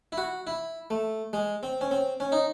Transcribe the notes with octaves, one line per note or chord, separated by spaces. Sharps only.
E4
F#4
E4
A3
G#3
C4
C#4
C4
C#4
D#4